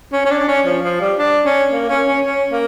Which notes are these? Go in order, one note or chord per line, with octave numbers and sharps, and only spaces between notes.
C#4
C#4
D4
C#4
F3
F3
G3
D4
C#4
A#3
C#4
C#4
C#4
A#3